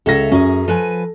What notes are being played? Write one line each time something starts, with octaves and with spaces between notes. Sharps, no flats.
C#2 A4 C#5 E5 A#6
F#2 C#4 G#4
F3 A4 B4 G#5